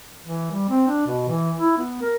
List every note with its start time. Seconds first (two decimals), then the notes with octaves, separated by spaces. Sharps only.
0.25 E3
0.51 G3
0.69 C4
0.88 D4
1.07 B2
1.28 E3
1.57 E4
1.78 B3
2.02 A#4